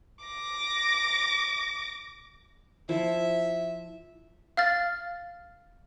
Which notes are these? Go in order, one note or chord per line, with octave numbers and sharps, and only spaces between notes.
D6 A#6
F3 E4 E5
F5 F6 A6